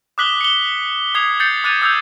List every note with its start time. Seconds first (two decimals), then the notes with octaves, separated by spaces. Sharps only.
0.18 D6 D#6 F#6 B6 F#7 G7
0.41 C#7 G7
1.15 D#6 G#6 C7 F7 G7
1.40 G6 A6 C7 C#7 F#7
1.64 D6 F#6 G#6 A6 D#7 F7
1.82 D#6 E6 G6 G#6 F7